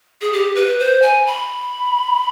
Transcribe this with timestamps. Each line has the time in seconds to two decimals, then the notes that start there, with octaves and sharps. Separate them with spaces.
0.21 G#4
0.33 G4
0.55 B4
0.79 C5
1.02 G#5
1.27 B5